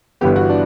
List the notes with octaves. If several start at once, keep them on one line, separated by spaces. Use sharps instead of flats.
G1 G2 E3 B3 G4
F#4
D4